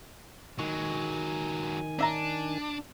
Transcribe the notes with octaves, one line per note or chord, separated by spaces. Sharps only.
D#3 F#3 G#3 G#5 C#6
C#4 D4 E5 A#5